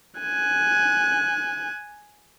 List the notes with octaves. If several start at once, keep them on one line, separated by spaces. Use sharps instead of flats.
G#5 F#6